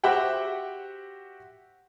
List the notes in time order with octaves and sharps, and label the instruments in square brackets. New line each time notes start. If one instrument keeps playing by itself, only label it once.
[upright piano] F#4 G4 C5 E5 F#5 G5